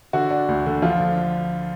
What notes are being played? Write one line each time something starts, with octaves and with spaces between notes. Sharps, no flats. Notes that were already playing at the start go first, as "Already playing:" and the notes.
D3 F#4
D4
D2
D3
F3 F4
D3